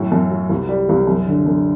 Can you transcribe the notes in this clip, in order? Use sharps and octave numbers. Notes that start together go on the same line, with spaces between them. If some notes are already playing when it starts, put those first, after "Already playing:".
Already playing: F#2 A2
F#2
F#3
C2
G3
C2
F#2
D3
F#2